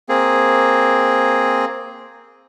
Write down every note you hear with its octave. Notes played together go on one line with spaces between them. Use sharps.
A#3 C4 G#4